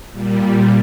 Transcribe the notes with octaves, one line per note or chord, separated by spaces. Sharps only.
A#2 G3